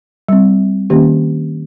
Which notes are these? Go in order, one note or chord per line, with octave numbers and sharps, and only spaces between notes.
G3 C4
D#3 A#3 C#4 G4